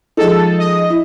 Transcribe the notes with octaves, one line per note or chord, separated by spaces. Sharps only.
F3 G#3 D#4 A4
D#5
E4